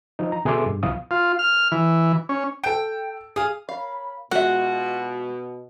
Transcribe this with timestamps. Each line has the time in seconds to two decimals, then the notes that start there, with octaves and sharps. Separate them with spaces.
0.19 F3 D#4
0.32 A#5
0.45 B2 G#4 A4 E5 C6 D6
0.66 G2
0.83 C2 B2 F3 E4 F5 D#6
1.11 F4
1.39 F6
1.72 E3
2.29 C#4
2.64 A4 G5 D7
3.36 G#4 F5 D#6
3.69 A#4 C#5 F5 B5
4.31 B2 G#3 F4 F#4 E5 F#5